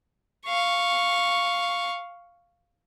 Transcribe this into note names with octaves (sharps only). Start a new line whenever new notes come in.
F5 C#6